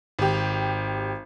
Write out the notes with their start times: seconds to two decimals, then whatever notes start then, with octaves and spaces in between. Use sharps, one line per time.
0.19 G#1 G4